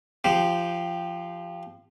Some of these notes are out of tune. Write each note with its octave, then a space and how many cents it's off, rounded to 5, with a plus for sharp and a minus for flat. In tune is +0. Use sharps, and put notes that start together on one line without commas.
F3 -20 G4 -5